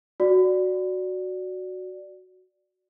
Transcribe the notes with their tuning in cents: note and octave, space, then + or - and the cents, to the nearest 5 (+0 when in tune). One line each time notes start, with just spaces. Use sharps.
F#4 +0 D5 +0